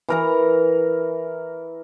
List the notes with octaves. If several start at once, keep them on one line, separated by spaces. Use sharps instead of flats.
E3 A#4 A#5